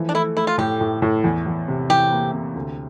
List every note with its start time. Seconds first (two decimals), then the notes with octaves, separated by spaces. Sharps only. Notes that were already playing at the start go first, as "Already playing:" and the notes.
Already playing: E3 F3 A3
0.09 D4
0.14 A3 E4
0.36 A3 E4
0.47 F4
0.58 A2 G4
0.81 A2
1.02 A2
1.24 E2
1.47 E2
1.68 C3
1.90 E3 G4
2.12 A#3
2.33 C3
2.55 D2